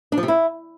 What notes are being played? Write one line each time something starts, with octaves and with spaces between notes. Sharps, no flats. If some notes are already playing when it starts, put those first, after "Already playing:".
D4
F3
C3
E4